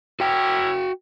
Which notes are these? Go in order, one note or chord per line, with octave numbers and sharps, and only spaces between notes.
E4 F#4 A#4 C#5 G5